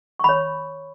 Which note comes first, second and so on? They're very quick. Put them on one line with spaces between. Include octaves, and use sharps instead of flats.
C#6 B5 C#5